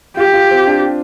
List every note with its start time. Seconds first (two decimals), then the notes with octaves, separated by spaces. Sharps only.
0.17 F4 G4
0.33 F4
0.51 C4
0.67 D4